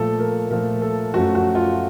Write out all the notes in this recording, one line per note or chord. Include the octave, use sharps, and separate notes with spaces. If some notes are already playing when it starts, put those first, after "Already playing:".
Already playing: A#2 F3 A3 A4
A#4
A#2 F3 A3 A#4
A4
F#2 F3 A3 F#4
F#4
F4